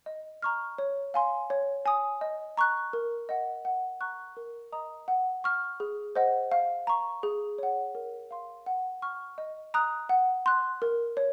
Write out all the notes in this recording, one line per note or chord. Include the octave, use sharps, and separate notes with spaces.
D#5
A#5 C#6 F6
C#5
F5 G#5 C6
C#5
G#5 D#6
D#5
A#5 C#6 F#6
A#4
D#5 F#5
F#5
A#5 C#6 F#6
A#4
D#5 A#5 D#6
F#5
C#6 F6
G#4
C5 D#5 F#5
F5
A#5 C#6
G#4
C#5 F#5
A#4
F5 C6
F#5
C#6 F6
D#5
A#5 D#6 F#6
F#5
C6 F#6
A#4
C#5